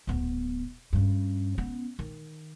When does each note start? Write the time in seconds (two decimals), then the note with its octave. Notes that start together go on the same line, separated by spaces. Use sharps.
0.07 D1 B3
0.93 G2 C#4
1.58 B3 C#4
1.99 D#3